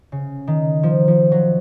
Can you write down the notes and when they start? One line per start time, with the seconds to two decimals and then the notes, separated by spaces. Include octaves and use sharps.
0.12 C#3
0.47 D#3
0.83 F3
1.08 F3
1.32 F#3